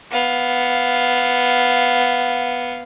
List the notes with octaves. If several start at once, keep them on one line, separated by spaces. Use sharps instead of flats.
B3 F5